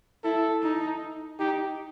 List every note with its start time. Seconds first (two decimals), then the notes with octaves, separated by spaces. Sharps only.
0.24 E4 A4
0.62 D#4
1.39 D#4 G4